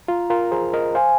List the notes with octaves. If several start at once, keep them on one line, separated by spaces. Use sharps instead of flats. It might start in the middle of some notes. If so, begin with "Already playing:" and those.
F4 A#5
F4 A#4
G#4 C5
A#4 D#5
C5 F5 G#5